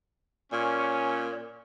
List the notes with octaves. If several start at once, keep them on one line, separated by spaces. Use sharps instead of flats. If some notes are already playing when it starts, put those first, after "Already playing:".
A#2 C#4